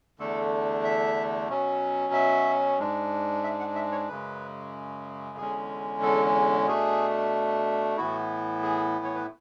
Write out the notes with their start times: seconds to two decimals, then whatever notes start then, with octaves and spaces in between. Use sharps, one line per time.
0.19 E2 D3 A3 D4 A4
0.84 E5
1.49 B2 F#3 C#4
2.13 E5
2.78 G#2 G#3 D4
3.44 E5
3.60 F#5
3.75 E5
3.92 C#5
4.08 F#2 C#3 G#3 B4
5.38 E2 D3 G#3 C#4 G#4
6.02 A4
6.67 B2 A3 D4 G#4
7.97 A2 E3 B3 E4 F#4
8.63 G#4
9.04 C#5
9.15 B4